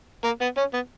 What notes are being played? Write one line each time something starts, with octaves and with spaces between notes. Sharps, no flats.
A#3
B3
C#4
B3